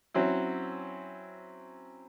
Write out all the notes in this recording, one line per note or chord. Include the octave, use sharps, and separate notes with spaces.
F#3 C4 C#4 E4